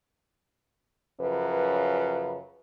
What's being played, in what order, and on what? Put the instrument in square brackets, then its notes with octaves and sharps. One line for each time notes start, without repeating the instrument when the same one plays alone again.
[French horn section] F#2 C#3 F3 B4